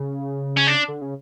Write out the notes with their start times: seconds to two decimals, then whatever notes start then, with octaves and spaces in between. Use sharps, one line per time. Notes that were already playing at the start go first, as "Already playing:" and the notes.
Already playing: C#3
0.57 C#4
0.67 D4
0.88 D3
1.01 C#3